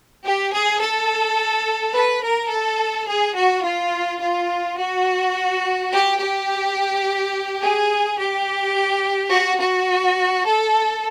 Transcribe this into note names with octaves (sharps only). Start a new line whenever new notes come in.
G4
G#4
A4
B4
A#4
A4
G#4
F#4
F4
F4
F#4
G4
G4
G#4
G4
F#4
F#4
A4